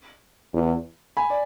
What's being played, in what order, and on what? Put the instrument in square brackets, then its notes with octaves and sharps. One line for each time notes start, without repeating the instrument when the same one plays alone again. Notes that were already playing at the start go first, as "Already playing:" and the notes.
[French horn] E2
[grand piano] G#5 B5
D5